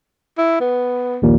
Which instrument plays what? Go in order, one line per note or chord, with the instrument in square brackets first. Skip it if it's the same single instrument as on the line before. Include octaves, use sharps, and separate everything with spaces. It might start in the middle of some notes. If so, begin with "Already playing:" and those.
[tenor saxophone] E4
B3
[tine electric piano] A#1 D#2 A#2